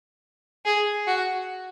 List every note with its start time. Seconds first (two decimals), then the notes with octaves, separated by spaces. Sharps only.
0.66 G#4
1.07 F#4